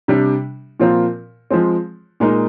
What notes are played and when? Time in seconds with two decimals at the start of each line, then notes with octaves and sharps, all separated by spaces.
0.08 C3 G3 D4 G4
0.80 A#2 F3 C4 F4 A#4
1.51 F3 G#3 C4
2.20 A#2 G#3 D#4 A#4